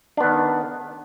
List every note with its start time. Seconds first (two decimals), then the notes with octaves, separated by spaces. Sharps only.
0.17 D4
0.20 B3
0.24 D#3